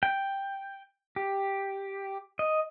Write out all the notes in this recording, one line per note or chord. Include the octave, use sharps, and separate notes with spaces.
G5
G4
D#5